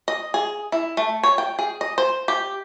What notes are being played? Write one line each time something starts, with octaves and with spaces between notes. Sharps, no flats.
D#5
G#4
E4
A3
C#5
G5
G#4
D#5
C5
G4